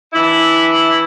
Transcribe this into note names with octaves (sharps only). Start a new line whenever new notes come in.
E3 D4 E4